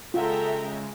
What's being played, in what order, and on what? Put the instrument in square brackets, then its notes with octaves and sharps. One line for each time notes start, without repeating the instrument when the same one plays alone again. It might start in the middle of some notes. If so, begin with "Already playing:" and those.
[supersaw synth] C#3 G#3 [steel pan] F4 F#5 [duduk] A4 [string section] E5 G5 A#5